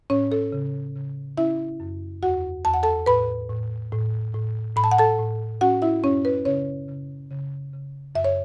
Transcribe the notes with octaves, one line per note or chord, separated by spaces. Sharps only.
A2 C#4 C#5
A4
C#3
C#3
C#4 E4 E5
F#2
E2 F#4 F#5
E2 A5
F#5
A4 A5
A2 B4 B5
A2
A2
A2
A2 B5
A5
F#5
A4 A5
A2
C#4 F#4 F#5
E4 E5
F#2 C#4 C#5
B4
C#3 C#4 C#5
C#3
C#3
C#3
F#2 E5
C#5